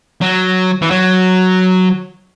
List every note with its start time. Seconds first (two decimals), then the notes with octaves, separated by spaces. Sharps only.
0.22 F#3
0.82 E3
0.91 F#3